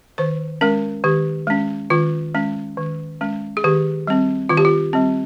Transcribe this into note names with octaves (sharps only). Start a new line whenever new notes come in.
D#3 C5
G#3 C#4 A#4
D#3 G4
G#3 C#4
D#3 F4
G#3 C#4
D#3
G#3 C#4
G#4
D#3 G4
G3 C4
D#3 F4
G4
F4
G3 C4